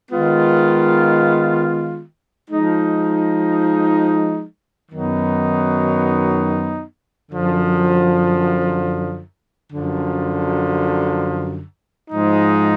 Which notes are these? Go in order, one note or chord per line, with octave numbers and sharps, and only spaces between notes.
D#3 G#3 B3 F4
F3 G#3 D#4
F#2 D#3 F#3 B3 D#4
F#2 D3 F3
F#2 D3 F3
G#2 F3 G#3 D#4